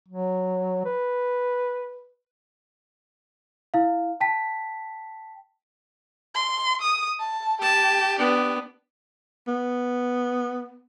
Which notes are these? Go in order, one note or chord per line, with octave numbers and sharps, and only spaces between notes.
F#3
B4
E4 F5
G5 A5 B6
C6
D#6
A5
G4 A5
B3 D4
B3